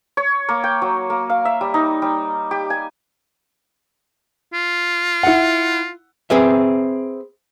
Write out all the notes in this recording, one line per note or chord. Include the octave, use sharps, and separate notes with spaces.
C#5
A#3
G5
F#3
A#3
F5
E5
G3
D#4
G3
G4
G#5
F4
E4 F#5
C4 G#4 B4 E5